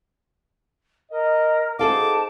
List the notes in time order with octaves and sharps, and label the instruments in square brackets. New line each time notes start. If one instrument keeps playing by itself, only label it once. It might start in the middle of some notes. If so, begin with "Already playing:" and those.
[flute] A#4 [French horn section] D#5
[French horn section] D#4 F#4 C5 [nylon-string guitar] G#4 A4 F5 [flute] A5 [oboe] D6